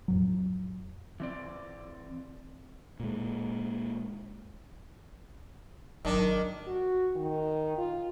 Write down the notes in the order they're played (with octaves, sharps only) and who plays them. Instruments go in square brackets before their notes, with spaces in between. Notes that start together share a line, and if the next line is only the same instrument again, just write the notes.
[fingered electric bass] F2 A2 F#3
[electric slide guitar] E3 C4 D5
[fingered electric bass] A#2 G#3
[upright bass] G#1 F#3 [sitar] D#3 D4
[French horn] F#4
D#3
F4